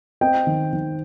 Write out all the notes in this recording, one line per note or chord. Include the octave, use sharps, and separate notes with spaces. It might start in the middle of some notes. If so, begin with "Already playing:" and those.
C4 D#5 G5
D#3
D#3